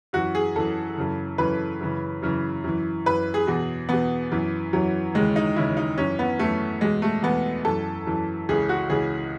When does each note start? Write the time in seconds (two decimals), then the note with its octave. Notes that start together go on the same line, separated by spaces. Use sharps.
0.13 F#2 E3 F#4
0.35 G#4
0.56 F#2 E3 A4
0.97 F#2 C#3 E3
1.38 F#2 C#3 E3 B4
1.81 F#2 C#3 E3
2.22 F#2 C#3 E3
2.64 F#2 E3
3.06 F#2 E3 B4
3.34 G#4
3.47 E2 B2
3.89 E2 B2 B3
4.32 F#2 E3
4.73 F#2 E3 F#3
5.14 D#2 C#3 E3 G#3
5.36 D#4
5.56 D#2 C#3 E3 E4
5.77 D#4
5.98 F#2 E3 C#4
6.19 B3
6.39 F#2 E3 A3
6.81 E2 B2 G#3
7.02 A3
7.23 E2 B2 B3
7.65 F#2 E3 A4
8.07 F#2 E3
8.49 C#2 C#3 E3 G#4
8.69 F#4
8.89 C#2 C#3 E3 G#4